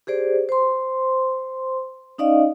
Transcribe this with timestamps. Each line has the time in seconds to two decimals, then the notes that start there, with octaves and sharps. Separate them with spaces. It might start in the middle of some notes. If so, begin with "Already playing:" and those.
0.07 G4 G#4 C5 D5
0.49 C5 C6
2.18 C#4 D#4 D5 D#5 F5